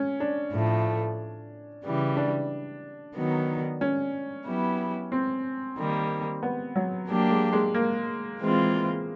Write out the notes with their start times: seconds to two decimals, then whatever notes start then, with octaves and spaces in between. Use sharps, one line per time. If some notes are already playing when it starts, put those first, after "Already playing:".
Already playing: C#4
0.20 D4
0.53 A2 F3 A3
1.84 C#3 E3 G3
2.17 D4
3.15 D#3 F#3 B3
3.81 C#4
4.46 F#3 B3 E4 G4
5.12 C4
5.78 D#3 G3 A#3
6.43 B3
6.76 F#3
7.09 F#3 A#3 D4 G4
7.31 G#3
7.52 G#3
7.74 A#3
8.40 E3 G#3 C4 F4